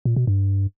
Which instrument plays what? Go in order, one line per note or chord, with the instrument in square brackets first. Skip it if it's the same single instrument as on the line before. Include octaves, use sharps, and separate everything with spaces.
[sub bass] A#2
B2
G2